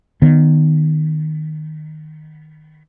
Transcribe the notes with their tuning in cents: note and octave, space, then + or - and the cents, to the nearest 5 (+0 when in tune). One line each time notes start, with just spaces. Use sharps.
D#3 -10 B3 +0